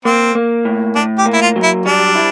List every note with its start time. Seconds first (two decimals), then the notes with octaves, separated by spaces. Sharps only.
0.05 A#3 C4
0.35 A#3
0.65 A2
0.95 A2 D4
1.18 G4
1.26 A#3
1.33 E4
1.41 F4
1.56 F#3
1.63 E4
1.86 G3 D4
2.15 E4